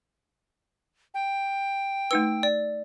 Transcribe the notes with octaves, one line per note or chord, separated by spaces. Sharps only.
G5
A3 D#4 B4 E6
D5